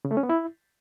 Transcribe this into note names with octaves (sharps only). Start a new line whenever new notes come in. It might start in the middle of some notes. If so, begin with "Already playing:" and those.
C#3
A3
C#4
B3
E4